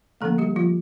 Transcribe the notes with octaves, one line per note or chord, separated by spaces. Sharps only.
D3 F3 A3 A#3 C#4 A4
G3 G4
F3 F4